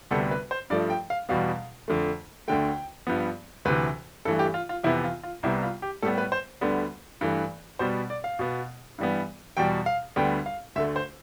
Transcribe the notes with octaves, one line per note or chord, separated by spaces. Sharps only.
D2 C3 G3 B3 A4
B4
C5
G2 F3 A3 D5
G5
F5
E2 B2 G3 B3 F5
F2 D3 A3
D2 D3 A3 G5
G2 F3 B3
D2 C3 E3 B4
G2 E3 A3 A4
G4
F4
F4
F2 C3 E3 B3 E4
F4
F4
C2 C3 G3 B3 E4
F4
G4
A2 G3 B3 A4
B4
C5
D2 D3 G3 B3
G2 E3 A3
B2 G3 B3 C5
D5
F5
B2 B3
G2 E3 G3 B3
E2 B2 G3 G5
F5
D2 D3 G3 B3 G5
F5
D2 D3 A3 E5
C5